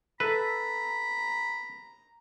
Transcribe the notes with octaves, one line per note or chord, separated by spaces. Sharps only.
A4 B4 E5 A#5 B5